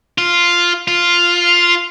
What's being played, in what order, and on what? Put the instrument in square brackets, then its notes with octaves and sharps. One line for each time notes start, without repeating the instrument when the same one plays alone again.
[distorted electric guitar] F4
F4